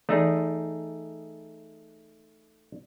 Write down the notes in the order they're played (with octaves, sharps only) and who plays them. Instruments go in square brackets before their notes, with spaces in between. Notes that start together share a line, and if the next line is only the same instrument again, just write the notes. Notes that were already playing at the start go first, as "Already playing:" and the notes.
[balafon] E3 [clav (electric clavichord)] A3 D#4 G#4